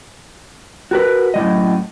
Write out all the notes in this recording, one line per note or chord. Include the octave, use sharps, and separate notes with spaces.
F#4 A#4 B4
F#2 A2 G3 D#5